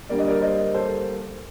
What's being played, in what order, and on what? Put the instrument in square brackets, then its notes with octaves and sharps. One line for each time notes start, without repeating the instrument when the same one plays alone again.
[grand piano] D3 G3 A#3 D5
D#5
A#4 D5
C5 D#5
A4 C5